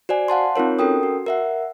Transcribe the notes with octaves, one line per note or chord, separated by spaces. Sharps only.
F#4 C5 D5 G#5
F5 F#5 A5 C6
C4 D#4 F4 A#4 C#5
C#4 F#4 A4 A#4 G5 D#6
F#4
A#4 E5 F#5